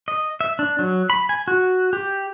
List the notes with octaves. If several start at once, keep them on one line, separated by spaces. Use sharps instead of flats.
D#5
E5
D4
F#3
B5
G#5
F#4
G4